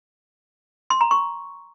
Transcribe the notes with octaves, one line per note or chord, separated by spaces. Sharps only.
C6
A#5
C#6